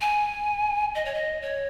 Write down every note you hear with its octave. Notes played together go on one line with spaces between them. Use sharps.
G#5
D#5
C#5
D#5
C#5